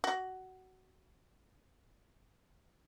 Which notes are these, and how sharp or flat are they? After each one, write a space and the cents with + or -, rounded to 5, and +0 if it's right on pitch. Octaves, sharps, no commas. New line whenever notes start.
F#4 +15